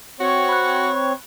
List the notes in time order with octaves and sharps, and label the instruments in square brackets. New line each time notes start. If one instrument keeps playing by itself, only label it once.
[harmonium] C4 C#5 [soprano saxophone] F#4 [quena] C#6
[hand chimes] B5 F#6